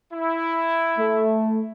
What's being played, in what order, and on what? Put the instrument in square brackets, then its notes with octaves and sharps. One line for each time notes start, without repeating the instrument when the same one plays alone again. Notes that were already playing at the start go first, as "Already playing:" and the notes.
[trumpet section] E4
[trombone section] A3